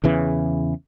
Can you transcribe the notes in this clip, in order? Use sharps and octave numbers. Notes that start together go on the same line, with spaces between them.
E2 C#3 E3